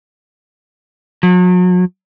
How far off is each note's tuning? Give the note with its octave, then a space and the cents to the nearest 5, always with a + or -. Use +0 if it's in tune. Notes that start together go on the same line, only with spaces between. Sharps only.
F#3 -40